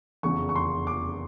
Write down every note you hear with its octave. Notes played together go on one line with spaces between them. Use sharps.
F1 E2 C#3 C#6
C#6
C6
D6